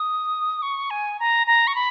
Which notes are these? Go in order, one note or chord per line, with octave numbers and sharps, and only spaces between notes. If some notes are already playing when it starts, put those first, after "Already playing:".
Already playing: D#6
C#6
G#5
A#5
A#5
C#6
B5